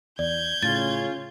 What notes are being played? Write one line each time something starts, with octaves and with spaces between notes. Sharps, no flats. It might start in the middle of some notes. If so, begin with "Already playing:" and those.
E2 D5 G6 G#6
A2 C#3 C#4 F4 A6